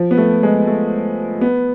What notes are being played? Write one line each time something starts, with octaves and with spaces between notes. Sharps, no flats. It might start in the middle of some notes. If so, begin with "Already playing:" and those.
Already playing: F3
B3
A3
G#3
A3
B3